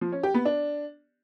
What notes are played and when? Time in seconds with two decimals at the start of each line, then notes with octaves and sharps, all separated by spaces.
0.01 F3
0.12 C#4
0.23 G4
0.34 B3
0.45 D4